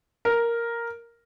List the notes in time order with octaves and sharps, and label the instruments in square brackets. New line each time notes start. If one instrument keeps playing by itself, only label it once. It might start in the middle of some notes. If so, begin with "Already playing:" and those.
[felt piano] A#4